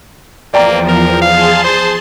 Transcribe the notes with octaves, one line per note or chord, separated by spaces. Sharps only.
E2 F3 A#3 D5 G5 A#5
A#4
G#4 F5 A5 C6
C5